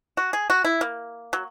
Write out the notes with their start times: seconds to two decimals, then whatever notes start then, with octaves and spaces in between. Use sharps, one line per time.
0.17 F#4
0.33 G#4
0.50 F#4
0.64 E4
0.81 A#3
1.33 F#3